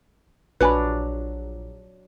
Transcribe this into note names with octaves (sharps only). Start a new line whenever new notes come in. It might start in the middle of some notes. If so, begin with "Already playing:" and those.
A#1 F#3 D4 B4 G#5 B5